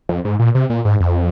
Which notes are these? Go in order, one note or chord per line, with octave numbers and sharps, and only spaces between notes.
F2
G#2
A#2
C3
A#2
G#2
F2